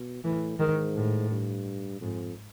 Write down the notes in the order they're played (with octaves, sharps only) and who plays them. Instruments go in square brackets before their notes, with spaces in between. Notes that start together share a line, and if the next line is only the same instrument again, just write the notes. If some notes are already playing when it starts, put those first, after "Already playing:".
Already playing: [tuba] B2
[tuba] A2 [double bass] E3
[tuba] G#2 [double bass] D#3
[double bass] A2
[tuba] G2
[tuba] F2 [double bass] G#2